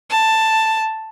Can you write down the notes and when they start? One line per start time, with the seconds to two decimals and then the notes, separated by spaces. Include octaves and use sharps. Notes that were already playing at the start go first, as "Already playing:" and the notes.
0.10 A5